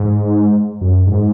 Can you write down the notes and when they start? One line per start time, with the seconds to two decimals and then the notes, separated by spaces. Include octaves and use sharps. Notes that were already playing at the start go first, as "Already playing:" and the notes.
Already playing: G#2
0.81 F#2
1.07 G#2